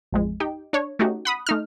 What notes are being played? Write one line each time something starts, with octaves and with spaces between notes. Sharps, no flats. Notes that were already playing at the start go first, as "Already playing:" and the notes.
A1 F2 G#3
D#4 G4 G5
D4 C#5
A3 C#4 D#4 F#4 G4
F#5 B5 D#6
A3 D#4 F6